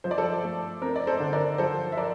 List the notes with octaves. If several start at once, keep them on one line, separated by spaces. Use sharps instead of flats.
F3 C5
D5
A4 C5
A3
C4 A#4
D5
A4 C5
D3
A#4 D5
F3 A4 C5
E5
A#4 D5